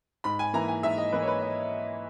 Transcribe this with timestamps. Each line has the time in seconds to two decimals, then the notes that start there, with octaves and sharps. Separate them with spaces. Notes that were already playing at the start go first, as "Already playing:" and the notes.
0.24 G#2 B5
0.39 G#5
0.53 E3 A#3 E4 A#5
0.68 G#5
0.83 G#2 E5
0.98 D#5
1.12 E3 A#3 E4 B4
1.22 C#5
1.28 B4
1.42 D#5